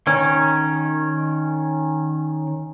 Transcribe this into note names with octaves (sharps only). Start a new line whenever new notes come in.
D#3 C#4